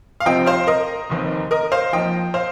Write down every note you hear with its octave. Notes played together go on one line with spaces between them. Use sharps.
F5
C2 C3 F3 C4 D#5 G5
C5 F5
A#4 D#5
F1 D#2 D#3 C4
A#4 D#5
C5 F5
F2 F3 A#3 D#5 G5
C5 F5